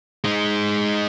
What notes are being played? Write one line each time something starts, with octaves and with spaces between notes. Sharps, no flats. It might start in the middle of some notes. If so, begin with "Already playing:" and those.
G#3 D#4